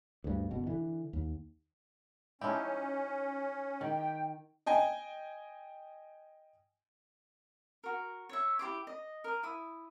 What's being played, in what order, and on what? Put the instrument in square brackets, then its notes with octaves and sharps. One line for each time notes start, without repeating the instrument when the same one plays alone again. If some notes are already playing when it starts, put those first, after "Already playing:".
[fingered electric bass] D2 G2
F#1 B2
D3 E3
D#2
[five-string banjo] F3 G4 [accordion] C#4 [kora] D#4 E4
[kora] D#3 [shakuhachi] G5
[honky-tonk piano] D#5 G5 G#5
[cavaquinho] F#4 A#4
C#5 E5
E4 G4 C5 D6
D#5
A#4 D#6
E4 D#6